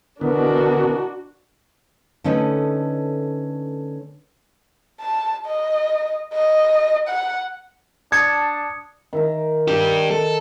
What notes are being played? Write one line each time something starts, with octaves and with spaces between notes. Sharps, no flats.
B2 D3 E3 B3 D4 F#4 A#4
D3 A3 C#4 D#4 B4 D#5
A5
D#5
D#5
F#5
D4 A5 D#6 G#6 C#7
D#3 E5 A#5
D4 G4
A4